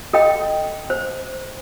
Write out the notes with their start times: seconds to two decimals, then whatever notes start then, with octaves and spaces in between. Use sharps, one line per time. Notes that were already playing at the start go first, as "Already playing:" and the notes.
0.13 A4 D#5 G5
0.90 C5